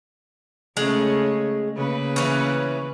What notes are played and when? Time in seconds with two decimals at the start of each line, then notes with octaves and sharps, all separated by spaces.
0.77 C#3 G#3 A3 C#4
1.76 C#3 A#3 B4
2.16 E3 C#4